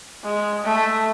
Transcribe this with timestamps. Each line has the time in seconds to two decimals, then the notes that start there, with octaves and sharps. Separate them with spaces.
0.24 G#3
0.64 A3